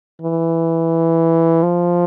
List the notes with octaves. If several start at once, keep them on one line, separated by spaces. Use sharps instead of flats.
E3
F3